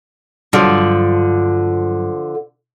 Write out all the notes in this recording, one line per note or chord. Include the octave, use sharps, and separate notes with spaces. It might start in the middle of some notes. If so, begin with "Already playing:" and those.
G2 D3 F3 F#3